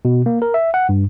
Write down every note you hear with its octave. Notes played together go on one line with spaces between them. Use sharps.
B2
A#3
A#4
E5
F#5
G2